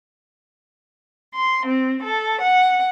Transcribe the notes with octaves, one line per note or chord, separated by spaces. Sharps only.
C6
C4
A4
F#5